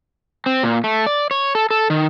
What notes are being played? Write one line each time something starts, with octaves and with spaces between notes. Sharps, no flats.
C4
A#2
A3
D5
C#5
A4
A4
D#3